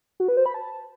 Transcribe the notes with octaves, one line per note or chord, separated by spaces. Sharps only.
F#4
B4
C5
B5
A5